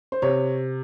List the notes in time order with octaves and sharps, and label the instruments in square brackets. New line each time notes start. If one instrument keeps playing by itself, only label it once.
[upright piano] C5
C3 C#5